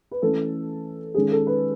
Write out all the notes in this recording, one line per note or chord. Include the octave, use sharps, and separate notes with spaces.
B4
E3 A3 C#4 A4
D#3 G#3 C#4 G#4
A4
B4